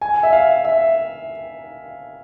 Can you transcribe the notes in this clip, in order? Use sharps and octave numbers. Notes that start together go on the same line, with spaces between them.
G#5
E5
F5
E5